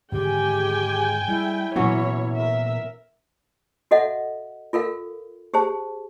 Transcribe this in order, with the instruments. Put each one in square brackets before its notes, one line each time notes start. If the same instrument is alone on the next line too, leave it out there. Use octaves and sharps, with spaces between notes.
[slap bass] G#2 D3 D#3 [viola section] G#3 G5 G#5 [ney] G4
[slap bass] G3 [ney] E4
[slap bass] A#2 B3 [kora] E3 F#3 C#4 [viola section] C#5
[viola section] A#4 E5
[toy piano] F#4 A4 D#5 E5 F#5
F4 A4 A#4 F5
G4 G#4 C5 A5